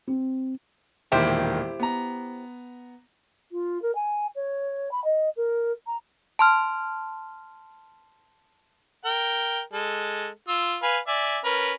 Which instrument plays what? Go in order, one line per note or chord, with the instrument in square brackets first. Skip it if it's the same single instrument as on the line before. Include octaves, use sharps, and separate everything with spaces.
[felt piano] C4
[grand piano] E1 A#2 D#3 [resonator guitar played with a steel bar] E4 G4 C5
[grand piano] B3 A#5
[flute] F4
A#4
G#5
C#5
B5
D#5
A#4
A#5
[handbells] A5 C6 F6
[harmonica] A#4 G5
G#3 A4
F4 E6
B4 F5 G#5
D5 E5 G#5
C#4 A#4 B4